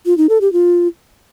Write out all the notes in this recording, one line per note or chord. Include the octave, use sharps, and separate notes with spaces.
F4
D#4
A4
G4
F4